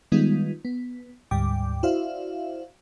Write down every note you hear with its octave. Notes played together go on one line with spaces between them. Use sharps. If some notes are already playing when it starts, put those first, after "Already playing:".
D#3 G3 G#3 B3 D#4 F4
B3
D2 G#2 G3 G5 D6
E4 F#4 C5 D5 E5 F5